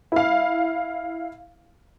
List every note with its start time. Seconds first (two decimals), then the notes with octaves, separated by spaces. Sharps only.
0.12 E4 F5